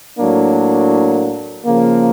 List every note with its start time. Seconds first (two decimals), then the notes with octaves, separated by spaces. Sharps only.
0.17 A2 F#3 A#3 D4
1.66 C#3 F3 A#3